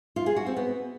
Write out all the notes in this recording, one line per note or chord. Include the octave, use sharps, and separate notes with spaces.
F4
G#4
F#4
C4
B3